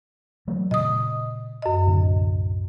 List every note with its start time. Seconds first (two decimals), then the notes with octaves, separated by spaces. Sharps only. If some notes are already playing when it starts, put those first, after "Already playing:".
0.48 E3 F#3 A3
0.71 A#2 C#3 D#5 D#6
1.62 F#2 D#5
1.87 C2 A2 D3